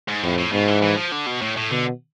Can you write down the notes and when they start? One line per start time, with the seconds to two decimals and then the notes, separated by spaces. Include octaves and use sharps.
0.08 G#2
0.23 F2 A2
0.38 A2
0.52 G#2 B2
0.68 E3
0.82 E3
0.97 F3
1.12 D3
1.26 B2
1.41 A2
1.57 A2
1.71 B2 D3